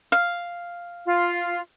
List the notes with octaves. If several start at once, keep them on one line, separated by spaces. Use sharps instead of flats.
F5
F4